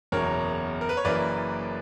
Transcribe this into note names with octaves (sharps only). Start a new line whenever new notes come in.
F#1 E2 B2 A#4 C#5
A#4
B4
C#5
F#1 F#2 E3 A#3 B4 D5